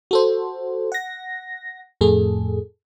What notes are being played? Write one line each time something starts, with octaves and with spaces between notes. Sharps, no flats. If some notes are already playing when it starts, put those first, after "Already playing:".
F#4 A4 C5
F#5 A#6
F2 A2 G#4 A4